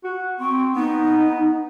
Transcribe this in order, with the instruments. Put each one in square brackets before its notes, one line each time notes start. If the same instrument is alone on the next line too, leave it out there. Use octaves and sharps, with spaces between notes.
[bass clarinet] F#4
[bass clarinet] C4 [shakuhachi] C#6
[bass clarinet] B3 [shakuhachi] D#4